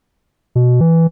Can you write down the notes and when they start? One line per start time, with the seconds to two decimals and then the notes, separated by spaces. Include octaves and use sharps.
0.55 B2
0.80 E3